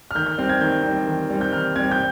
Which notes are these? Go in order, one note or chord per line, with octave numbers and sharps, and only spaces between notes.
F6
D#3 G6
G6
G3 C4 F6
G#6
D#3 G6
G3 C4
D#3
G3 C4
G6
D#3 F6
G3 C4 G#6
G6